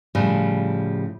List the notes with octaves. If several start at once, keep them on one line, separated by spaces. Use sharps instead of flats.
A2 C#3 F3 G3